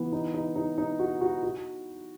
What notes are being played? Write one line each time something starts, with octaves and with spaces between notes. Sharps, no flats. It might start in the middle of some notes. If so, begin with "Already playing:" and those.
Already playing: E3 B3
D#4
D#4
D#4
D#4
F#4
F#4
F#4